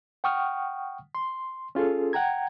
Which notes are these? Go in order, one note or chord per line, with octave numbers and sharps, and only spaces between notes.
F#5 G5 C#6 D#6 F6
C6
C#4 F4 G#4 A4
F#5 G5 A#5 G#6